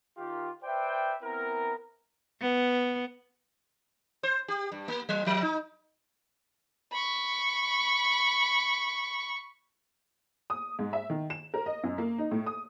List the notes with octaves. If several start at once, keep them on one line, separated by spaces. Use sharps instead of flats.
D#3 F4 G4
B4 C5 D5 E5 G5
B3 C4 E4 A#4
B3
C5
G4
G2
A#3
F#3
F3
D#4
B5 C#6
D#6
G#2
E5
D#3
E7
A#4
D#5
F#2
A#3
D#4
A2
D#6